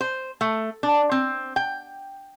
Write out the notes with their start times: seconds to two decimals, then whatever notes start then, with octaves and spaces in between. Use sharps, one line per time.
0.01 C5
0.41 A3
0.83 D4
1.12 C4
1.56 G5